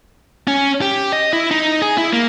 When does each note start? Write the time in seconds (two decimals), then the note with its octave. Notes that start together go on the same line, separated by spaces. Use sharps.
0.47 C#4
0.81 G4
1.12 D#5
1.33 E4
1.51 D#4
1.82 G#4
1.98 E4
2.13 A#3